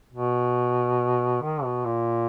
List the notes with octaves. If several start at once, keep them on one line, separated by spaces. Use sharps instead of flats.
B2
D#3
B2
A#2